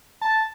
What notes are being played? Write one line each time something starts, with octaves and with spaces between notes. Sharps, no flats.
A5